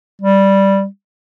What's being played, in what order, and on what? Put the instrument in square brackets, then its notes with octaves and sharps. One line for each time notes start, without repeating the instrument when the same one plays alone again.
[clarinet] G3